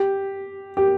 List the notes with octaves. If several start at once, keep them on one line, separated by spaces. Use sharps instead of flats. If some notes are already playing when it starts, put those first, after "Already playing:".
Already playing: G4
G4